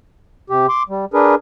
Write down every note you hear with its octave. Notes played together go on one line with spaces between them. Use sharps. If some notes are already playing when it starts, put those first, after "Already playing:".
C3 G4
C6 D6
G3
D4 G#4 A#4 B4